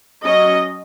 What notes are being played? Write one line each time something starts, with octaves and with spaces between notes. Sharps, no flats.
F#3 C#4 D#5